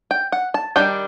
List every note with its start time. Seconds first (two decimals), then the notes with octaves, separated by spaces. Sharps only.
0.11 G5
0.32 F#5
0.54 A5
0.76 D#3 G3 D4 G5